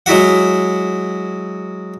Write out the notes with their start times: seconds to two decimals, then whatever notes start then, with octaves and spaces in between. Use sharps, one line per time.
0.06 F#3 G#3 E4 F#4 F#5